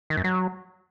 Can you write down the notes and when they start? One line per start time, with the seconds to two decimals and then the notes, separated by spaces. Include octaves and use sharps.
0.10 D#3
0.17 F#2
0.24 F#3